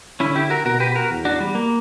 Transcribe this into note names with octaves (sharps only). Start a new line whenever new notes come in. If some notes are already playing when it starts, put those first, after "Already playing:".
D3 C#4 E4
E4 G4
F#4 A#4
B2 F#4 A#4
G4 B4
F#4 A#4
E2
D4 F#4
G3
A#3